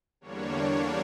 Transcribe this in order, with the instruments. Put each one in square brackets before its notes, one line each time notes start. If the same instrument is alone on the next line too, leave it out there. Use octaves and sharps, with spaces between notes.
[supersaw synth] E2 D3 G3 A#3 D4 C#5